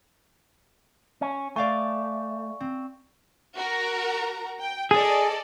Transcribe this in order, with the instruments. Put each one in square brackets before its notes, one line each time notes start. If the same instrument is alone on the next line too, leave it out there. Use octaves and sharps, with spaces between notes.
[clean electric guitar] C#4
[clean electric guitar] A3 [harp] D5 F5 G#5 [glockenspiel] C#6
[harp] C4
[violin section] F#4 A#4 A#5
G5
[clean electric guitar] G#4 [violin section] A4 D5 D#5